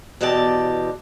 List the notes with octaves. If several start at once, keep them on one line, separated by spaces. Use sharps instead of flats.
E2 B2 E3 G4 D5 A5